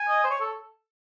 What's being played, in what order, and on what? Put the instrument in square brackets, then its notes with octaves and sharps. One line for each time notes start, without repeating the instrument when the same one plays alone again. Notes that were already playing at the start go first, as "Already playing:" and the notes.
Already playing: [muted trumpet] G#5
[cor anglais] D#5
C5
C#5
A4